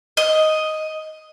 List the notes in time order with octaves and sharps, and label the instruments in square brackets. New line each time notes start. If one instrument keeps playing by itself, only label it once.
[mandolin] D#5